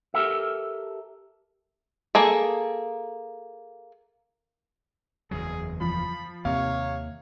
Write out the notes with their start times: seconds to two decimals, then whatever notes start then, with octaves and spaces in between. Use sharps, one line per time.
0.14 G4 A4 A#4 E5
2.15 A#3 G#4 A4
5.31 F#1 E2 F#3 G#4
5.81 F3 B5
6.45 D#2 C3 A#3 C#5 F5